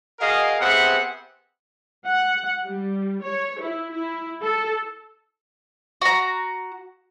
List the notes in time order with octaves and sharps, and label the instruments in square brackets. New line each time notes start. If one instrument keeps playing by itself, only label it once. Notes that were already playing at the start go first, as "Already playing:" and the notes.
[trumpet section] F#4 G#4 A#4 D#5 F5
B3 C4 G4 G#4 E5 F#5
[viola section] F#5
G3
C#5
E4
E4
A4
[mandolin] F#4 A#5